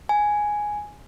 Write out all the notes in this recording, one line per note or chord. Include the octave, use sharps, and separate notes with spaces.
G#5